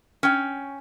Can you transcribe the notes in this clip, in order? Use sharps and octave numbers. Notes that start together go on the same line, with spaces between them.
C#4 G5